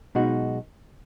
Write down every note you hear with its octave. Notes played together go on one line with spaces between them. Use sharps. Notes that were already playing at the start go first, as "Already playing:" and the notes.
B1 B2 G#3 D#4 F#4